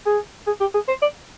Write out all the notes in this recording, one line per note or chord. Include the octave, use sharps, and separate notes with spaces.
G#4
G#4
G4
G#4
C5
D5